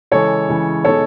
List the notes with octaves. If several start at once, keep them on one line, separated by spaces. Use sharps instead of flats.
C#3 E3 G#3 A4 C#5
C#3 E3 G#3
B2 G#3 D#4 A4 C#5